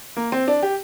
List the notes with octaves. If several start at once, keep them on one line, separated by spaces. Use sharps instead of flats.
A#3
C4
D4
G4